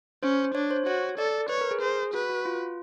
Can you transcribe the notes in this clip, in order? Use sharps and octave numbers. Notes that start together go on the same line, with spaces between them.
C#4 C5
D4 C#5
C5
F#4 C#5
A4 D5
B4 C#5
A#4
G#4
G#4 C5
F#4 B4
F#4
F4